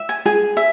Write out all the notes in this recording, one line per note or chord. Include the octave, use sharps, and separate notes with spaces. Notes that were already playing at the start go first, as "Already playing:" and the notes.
Already playing: E5
G#5
G#4 G#5
E5